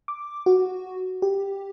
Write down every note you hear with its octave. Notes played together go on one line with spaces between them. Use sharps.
D6
F#4
G4